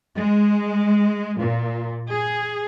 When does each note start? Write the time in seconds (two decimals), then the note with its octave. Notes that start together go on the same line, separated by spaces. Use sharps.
0.16 G#3
1.39 A#2
2.11 G#4